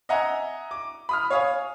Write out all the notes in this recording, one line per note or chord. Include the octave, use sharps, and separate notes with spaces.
D#5 E5 F#5 G#5 A#5
D6
B5 D#6 F6
C#5 F5 G#5 D#6